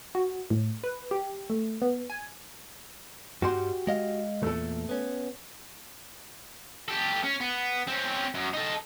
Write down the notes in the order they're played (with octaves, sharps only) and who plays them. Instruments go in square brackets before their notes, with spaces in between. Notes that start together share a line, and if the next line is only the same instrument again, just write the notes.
[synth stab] F#4
A2
B4
G4
A3
B3
G#5
[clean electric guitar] G2 G3 C6 [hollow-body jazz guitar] F#4 G4
[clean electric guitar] G#3 D#5 F5
[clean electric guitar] E2 A#2 [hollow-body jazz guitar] A3 A4
[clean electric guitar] B3 C#4
[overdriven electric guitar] G4 A4
C#4
B3
C4 C#4
F#2
D#4 A4